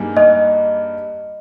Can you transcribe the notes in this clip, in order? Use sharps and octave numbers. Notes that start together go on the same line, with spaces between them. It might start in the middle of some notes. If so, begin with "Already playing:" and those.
Already playing: G2 G3 A#3 D#4 G#4
D#5